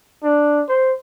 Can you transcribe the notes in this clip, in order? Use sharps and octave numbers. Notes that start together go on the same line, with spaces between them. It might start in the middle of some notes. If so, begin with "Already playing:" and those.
D4
C5